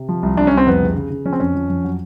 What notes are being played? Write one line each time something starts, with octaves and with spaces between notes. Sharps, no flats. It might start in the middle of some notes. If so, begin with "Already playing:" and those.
Already playing: C3
F3
C2
C2 D4
C#4
C2 C4
F2 B3
C#3
C#3
C#3
F3 C#4
C4
F2 C#4
F3
F2
F#3